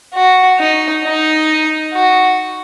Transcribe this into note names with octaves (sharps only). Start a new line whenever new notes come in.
F#4
D#4
D#4
F#4